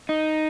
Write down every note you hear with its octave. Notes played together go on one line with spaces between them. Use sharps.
D#4